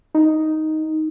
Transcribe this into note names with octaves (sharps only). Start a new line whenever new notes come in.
D#4